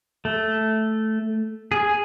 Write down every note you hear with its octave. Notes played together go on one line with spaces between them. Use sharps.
A3
G#4